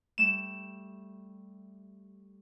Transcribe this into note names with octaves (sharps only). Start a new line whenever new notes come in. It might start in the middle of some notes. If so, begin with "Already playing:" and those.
G3 A3 E7